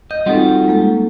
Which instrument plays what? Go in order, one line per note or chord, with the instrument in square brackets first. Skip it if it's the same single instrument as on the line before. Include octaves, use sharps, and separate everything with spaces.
[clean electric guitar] D#5 [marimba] G6
[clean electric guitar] G3 F4 F#4 [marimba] C4 D#4 A4
[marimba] G#3 A#3 A4